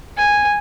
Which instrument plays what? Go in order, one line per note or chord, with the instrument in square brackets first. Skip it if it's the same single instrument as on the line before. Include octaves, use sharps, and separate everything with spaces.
[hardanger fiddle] G#5